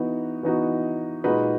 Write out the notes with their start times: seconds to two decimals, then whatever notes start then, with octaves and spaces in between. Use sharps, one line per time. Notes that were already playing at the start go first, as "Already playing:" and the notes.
Already playing: E3 B3 D#4 F#4
0.43 E3 B3 D#4 F#4
1.24 A#2 G#3 D#4 F#4 B4